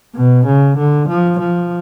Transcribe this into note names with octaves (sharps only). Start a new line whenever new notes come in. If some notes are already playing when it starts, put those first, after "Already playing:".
B2
C#3
D3
F3
F3